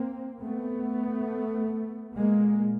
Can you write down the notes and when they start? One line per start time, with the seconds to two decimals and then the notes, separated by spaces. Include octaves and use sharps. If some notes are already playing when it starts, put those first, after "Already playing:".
Already playing: A#3 C4
0.41 A3 B3
2.16 A#2 G#3 A#3